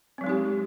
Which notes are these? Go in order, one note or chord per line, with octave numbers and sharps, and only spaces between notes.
F#3 G#3 C4 D#4 G4